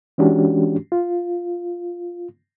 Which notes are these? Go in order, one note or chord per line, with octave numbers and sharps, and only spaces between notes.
E3 G#3 C#4 D4 F#4 G4
F4